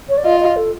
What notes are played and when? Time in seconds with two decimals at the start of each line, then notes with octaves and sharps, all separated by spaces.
0.09 C#5
0.17 D5
0.25 F4 D#5
0.40 D#5
0.56 A4